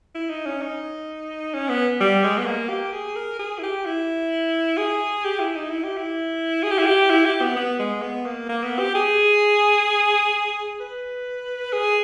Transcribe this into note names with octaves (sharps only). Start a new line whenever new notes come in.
E4
D#4
C#4
D#4
C#4
B3
G3
G#3
B3
A#3
G4
G#4
A#4
G#4
E4
G4
E4
G#4
G4
E4
D#4
E4
G4
E4
G#4
G4
E4
G4
E4
G4
B3
B3
G#3
B3
A#3
A#3
B3
G4
G#4
B4
G#4